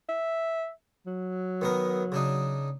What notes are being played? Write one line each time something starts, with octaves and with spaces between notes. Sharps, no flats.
E5
F#3
D#3 B3 A#4
C#3 D4 D#4